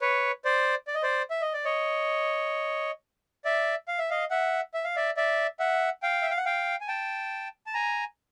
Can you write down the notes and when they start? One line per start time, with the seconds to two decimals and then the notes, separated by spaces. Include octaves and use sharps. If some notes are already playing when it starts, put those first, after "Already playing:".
0.01 B4 C#5
0.45 C5 D5
0.87 D5
0.95 D#5
1.03 C5 D5
1.30 E5
1.42 D#5
1.53 D5
1.65 C#5 D#5
3.45 D5 E5
3.88 F5
3.99 E5
4.10 D#5 F5
4.30 E5 F#5
4.74 E5
4.84 F5
4.96 D5 E5
5.17 D5 E5
5.59 E5 F#5
6.02 F5 G5
6.22 E5
6.30 F5
6.37 F#5
6.45 F5 G5
6.81 G#5
6.88 G5 A5
7.66 A5
7.74 G#5 A#5